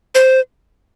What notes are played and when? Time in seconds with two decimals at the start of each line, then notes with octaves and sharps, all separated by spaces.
0.15 C5